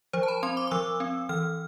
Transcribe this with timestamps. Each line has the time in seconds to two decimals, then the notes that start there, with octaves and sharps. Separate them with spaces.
0.13 F3 C5
0.23 A5
0.28 B5
0.43 C4 C6
0.57 D6
0.67 D6
0.71 F3 E6
1.00 C4
1.29 E3 F6